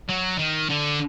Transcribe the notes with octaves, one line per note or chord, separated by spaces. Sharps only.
F#3
D#3
D3